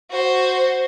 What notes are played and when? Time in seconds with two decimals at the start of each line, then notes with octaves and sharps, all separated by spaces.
0.11 F#4 C5